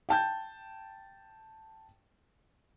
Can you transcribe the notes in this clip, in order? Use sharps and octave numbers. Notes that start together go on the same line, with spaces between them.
G5 A5 G6